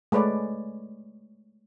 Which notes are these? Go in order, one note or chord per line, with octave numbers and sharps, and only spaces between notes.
G#3 A3 B4 C#5 D5